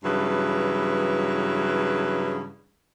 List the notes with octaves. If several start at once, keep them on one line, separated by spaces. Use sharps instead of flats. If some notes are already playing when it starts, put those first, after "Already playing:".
G2 C#3 E3 F#3 B4